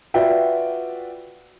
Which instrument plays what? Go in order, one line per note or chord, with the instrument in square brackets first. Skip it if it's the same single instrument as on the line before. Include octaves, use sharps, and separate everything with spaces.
[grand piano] F4 F#4 B4 D5 E5 G5